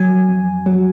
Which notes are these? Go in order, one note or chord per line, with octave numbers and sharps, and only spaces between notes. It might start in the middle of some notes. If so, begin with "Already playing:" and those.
Already playing: F#3 G#5
F2
F#3